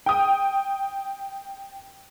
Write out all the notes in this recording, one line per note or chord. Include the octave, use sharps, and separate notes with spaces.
G5 D#6